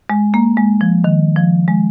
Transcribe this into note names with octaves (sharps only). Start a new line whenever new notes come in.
G#3
A#3
G#3
F3
D#3
F3
G#3